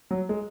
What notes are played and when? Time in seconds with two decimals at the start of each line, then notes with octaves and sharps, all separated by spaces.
0.11 F#3
0.29 G#3